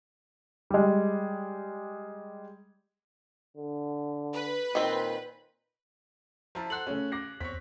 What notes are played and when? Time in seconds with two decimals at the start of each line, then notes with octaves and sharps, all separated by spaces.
0.70 G3 G#3
3.57 D3
4.34 B4
4.75 A#2 D#3 C4
6.55 F3 E4 A5 A#5
6.70 A4 C5 F#5 F#6 F#7
6.87 C#3 A3 C#4
7.12 D6 A#6 C7
7.40 E2 C4 C#5 B6